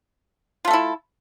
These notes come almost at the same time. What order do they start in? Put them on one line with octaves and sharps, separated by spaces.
F4 A3 A4 E4